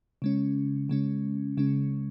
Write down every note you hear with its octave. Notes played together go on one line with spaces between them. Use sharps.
C#3 G#3 C#4
C#3 G#3 C#4
C#3 G#3 C#4